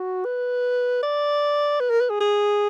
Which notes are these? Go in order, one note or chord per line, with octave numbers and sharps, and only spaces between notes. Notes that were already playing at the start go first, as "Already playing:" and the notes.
Already playing: F#4
B4
D5
B4
A#4
B4
G#4
G#4